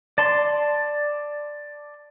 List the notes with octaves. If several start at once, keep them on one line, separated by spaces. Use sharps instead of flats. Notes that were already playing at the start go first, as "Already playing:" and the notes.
D5 A5 C6